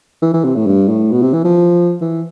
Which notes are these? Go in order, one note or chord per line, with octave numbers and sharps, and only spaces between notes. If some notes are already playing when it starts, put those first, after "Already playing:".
E3
E3
C3
A2
G2
A2
B2
C3
E3
F3
E3